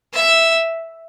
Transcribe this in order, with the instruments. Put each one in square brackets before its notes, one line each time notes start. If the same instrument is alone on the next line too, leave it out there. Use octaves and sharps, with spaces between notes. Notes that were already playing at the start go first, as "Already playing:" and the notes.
[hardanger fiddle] E5